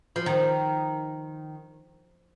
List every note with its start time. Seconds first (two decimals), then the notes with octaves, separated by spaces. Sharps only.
0.16 F3
0.26 D#3